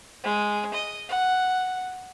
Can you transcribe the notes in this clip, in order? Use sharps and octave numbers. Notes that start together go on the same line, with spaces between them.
G#3
D#5
F#5